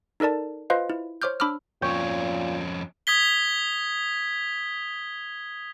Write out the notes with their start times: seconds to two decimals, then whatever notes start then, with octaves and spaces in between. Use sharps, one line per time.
0.20 D#4 A4 A#4 D5 A5
0.70 F4 B4 C5 D#5 F5
0.90 E4
1.22 C5 C#5 D6 F6 G6
1.40 D4 B5 D6 E6 F6
1.82 F2 A#2 C#4 C#5 G5
3.07 D#6 G#6 B6 G7